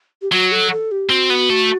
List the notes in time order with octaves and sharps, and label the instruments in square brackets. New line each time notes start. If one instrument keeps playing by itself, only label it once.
[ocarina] G4
[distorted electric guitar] F#3 [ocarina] F#4
[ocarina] A4
A4
G4
[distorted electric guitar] C4 [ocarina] F#4
[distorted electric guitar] B3
A3